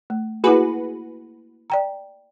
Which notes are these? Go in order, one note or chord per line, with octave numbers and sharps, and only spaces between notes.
A3
A#3 E4 F#4 G#4 B4
D5 G5 A#5